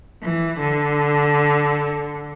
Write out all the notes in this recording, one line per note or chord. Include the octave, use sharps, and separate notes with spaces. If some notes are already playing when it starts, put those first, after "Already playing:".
E3
D3